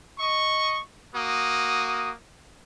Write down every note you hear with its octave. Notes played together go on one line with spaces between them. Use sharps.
D#5 C#6
A#3 F#4 D#6